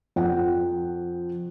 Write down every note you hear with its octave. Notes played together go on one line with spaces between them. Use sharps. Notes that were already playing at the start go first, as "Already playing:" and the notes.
F2 F#5 G5